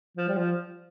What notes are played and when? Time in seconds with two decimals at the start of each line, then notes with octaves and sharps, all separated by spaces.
0.17 F3
0.28 G3
0.37 F3